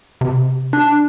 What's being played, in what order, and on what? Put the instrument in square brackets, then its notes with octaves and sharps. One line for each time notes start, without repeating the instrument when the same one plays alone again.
[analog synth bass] C3
[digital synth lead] D4